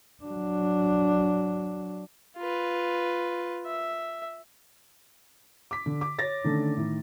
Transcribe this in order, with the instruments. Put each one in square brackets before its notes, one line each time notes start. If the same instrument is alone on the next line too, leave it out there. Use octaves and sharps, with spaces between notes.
[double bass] F#3 D4
[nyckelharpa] F4 B4
E5
[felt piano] D6 B6
D3
D6
C#5 A6 A#6
D3 D#3 A3 C#4 D4
A2 D#3